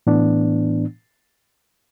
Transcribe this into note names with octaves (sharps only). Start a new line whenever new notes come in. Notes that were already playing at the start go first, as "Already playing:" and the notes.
A2 E3 B3 D4